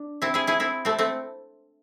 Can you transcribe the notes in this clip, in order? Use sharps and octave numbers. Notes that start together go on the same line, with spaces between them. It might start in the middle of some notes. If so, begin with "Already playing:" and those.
Already playing: D4
C4 E4
E4 G#4
E4 G#4
C4 E4
A3 C4
A3 C4